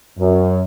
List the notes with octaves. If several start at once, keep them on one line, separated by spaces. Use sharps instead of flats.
F#2